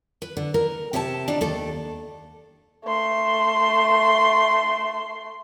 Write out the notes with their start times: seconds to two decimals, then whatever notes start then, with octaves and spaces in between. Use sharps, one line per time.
0.22 B4
0.37 D3
0.54 A#4
0.93 C3 G4 C#5 E5 A5
1.28 D4 D#4 D5
1.41 D#2 A4 D5
2.84 A3 C6